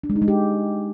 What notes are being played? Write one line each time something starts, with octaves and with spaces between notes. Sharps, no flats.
D4
G#3
D#4
G#3
G4